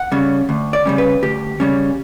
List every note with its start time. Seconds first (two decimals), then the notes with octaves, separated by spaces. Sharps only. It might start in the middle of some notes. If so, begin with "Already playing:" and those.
Already playing: F#5
0.12 C#3 G3 C#4
0.49 D2
0.73 D5
0.85 C#3 G3 C#4
0.98 B4
1.23 D2 G4
1.60 C#3 G3 C#4